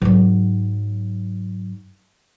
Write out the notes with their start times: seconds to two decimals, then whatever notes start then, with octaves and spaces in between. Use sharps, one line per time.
0.02 G#2 F#3